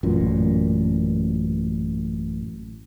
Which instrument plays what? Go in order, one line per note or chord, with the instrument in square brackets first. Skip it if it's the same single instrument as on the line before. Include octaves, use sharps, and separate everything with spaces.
[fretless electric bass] A1 F#2 A#2